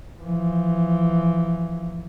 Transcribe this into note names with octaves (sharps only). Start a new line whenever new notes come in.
E3 F3